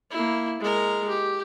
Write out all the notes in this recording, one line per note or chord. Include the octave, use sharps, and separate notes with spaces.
A#3 E4
G#3 A#4
G4